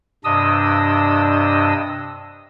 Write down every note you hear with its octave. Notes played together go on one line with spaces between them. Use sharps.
G2 C3 D4 D#5 D#6 E6